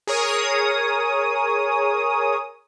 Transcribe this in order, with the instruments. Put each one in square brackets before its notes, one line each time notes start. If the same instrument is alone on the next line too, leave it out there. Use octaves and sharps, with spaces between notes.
[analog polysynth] G#4 A#4 C#5 D#6